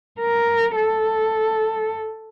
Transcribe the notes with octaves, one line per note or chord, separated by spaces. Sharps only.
A#4
A4